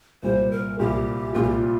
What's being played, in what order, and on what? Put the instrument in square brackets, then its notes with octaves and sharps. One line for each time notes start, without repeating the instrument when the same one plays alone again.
[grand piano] C2 A#2 G3 [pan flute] C5
[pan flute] A#4
[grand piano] C2 A#2 G3 [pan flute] G4
[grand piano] C2 A#2 G3 [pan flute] F4
[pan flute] G4
F4